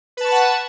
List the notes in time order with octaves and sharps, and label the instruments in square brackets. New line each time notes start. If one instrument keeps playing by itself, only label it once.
[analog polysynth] B4
A5
C#6
B5
F#5